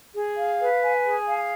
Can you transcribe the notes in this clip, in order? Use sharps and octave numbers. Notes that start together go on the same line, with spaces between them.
G#4
F5
B4
G#5
G#4
F5